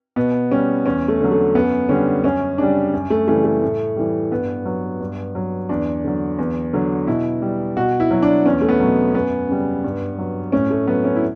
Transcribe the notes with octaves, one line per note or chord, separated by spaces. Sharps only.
B2 B3
G3 C#4
E2 C#4
A3
D3 F#3
A3
F#2 B3
D3 G3 C#4
F#2 C#4
C#3 G3 D4
F#2
A3
C#3 E3 G3 A3
A3
A2
E3 G3
G2 B3
F#3
G2
F#3
E2 D4
D3 F#3
E2
D3 F#3
B2 E4
G3
B2 F#4
E4
F#3
D4
E2 C#4
A3
B3
B2 F#3
F#2 B3
C#3 G3
G2
F#3
A2 C#4
A3
F#3 B3
C#4
E4